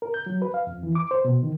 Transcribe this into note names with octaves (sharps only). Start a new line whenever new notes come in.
A#4
G6
F#3
B4
F5
F2
E3
D6
C5
B2
D#3